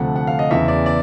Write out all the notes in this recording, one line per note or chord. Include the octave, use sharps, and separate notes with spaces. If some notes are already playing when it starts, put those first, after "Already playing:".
Already playing: D2 C3 F3 A3 F#5
F#5
F5
D#5
E2 C#3 E3 E5
D5
D5